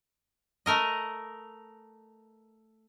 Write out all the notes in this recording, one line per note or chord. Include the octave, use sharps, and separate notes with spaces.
A3 A#4 D#5